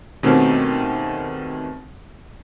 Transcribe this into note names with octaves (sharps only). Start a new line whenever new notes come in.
B2 D#3 A3 C4 C#4 G4